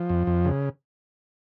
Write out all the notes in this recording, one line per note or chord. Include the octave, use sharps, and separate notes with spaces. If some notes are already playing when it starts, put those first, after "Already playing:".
Already playing: F3
F2
F2
C#3